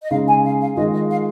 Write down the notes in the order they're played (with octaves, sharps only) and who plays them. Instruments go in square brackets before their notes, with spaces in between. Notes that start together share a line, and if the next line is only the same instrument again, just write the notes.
[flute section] D#5
[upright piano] C#3 G#3 D#4 G#4 [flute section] F5
[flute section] G#5
F5
F5
[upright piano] D#3 G#3 F4 G#4 [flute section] D#5
[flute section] D#5
F5